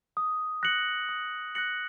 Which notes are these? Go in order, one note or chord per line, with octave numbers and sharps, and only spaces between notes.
D#6
F#6 A#6 C#7 F#7
D#6
F#6 A#6 C#7 F#7